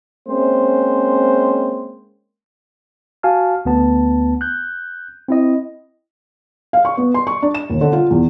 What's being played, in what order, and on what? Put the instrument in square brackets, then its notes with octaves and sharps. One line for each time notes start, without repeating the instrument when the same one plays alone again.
[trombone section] G#3 A#3 C4 C#4 C5
[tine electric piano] F#4 F5 G#5 A5 F6
D2 B3 A5
F#6 G6
C4 E4 D#5
[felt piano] F5
C#6
B3
C6
C#6
D4
E7
D#2
D3
F4
E2